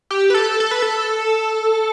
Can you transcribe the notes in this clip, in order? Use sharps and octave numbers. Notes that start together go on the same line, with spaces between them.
G4
B4
A4
A4
B4
A4